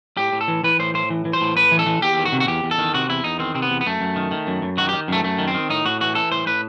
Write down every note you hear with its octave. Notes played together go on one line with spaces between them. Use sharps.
A2 G4
A2
A4
E3
E3 B4
A2 C5
A2 C5
E3
E3
C5
A2
A2 B4
E3
A4
E3
E2 G4
D#3
F#4
C3
F#4
E2 G4
E2
A4
D#3
C3 F#4
E2 E4
E2 D#4
D#3 C4
C3 C4
B3
E2
B3
F#2 A3
F#2
D#3
D#3
F#2
F#2
D#3 F#4
D#3 G4
F#2 A3
F#2 A3
D#3
C4
D#3
A2 D#4
A2 F#4
E3 F#4
E3 A4
A2 C5
A2 B4